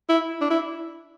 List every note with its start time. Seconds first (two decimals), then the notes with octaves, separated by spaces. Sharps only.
0.09 E4
0.41 D4
0.50 E4